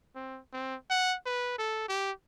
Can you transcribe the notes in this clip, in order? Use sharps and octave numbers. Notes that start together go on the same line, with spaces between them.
C4
C4
F#5
B4
A4
G4